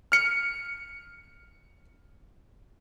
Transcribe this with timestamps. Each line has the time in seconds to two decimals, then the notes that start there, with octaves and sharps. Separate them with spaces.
0.12 F6 C#7